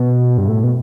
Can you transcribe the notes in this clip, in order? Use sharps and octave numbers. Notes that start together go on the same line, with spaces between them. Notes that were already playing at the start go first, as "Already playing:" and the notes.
Already playing: B2
G2
A2
B2